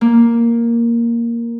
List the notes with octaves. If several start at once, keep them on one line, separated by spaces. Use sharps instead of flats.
A#3